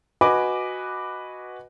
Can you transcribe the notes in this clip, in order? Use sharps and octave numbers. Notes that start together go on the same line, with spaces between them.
F#4 B4 D#5 G#5 B5 D6